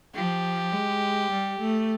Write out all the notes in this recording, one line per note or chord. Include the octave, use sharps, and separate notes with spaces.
F3 G4
G#3
G3
A3